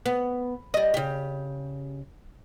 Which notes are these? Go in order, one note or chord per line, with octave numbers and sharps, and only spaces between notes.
B3
G3 D#5
C#3 G4